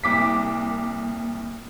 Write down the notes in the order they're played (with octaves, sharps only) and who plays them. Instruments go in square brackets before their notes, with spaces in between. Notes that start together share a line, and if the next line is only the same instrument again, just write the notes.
[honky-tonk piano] C2 D6 B6 [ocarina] A#3